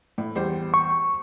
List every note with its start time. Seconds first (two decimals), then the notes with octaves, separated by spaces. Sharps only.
0.18 A2
0.35 E2 G3 C5
0.74 C#6